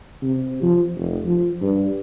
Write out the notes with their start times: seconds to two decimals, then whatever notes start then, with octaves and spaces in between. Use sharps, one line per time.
0.23 C3
0.62 F3
0.96 F1
1.25 F3
1.61 G2